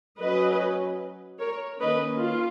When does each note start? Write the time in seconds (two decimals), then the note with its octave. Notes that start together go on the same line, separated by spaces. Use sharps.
0.19 F#3 C#4 B4 D#5
1.39 A#4 C#5
1.79 D#3 A#3 C#4 B4 D#5
2.20 F4